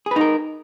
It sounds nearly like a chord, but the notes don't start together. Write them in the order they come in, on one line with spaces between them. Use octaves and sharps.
G#4 B4 D#4 A#4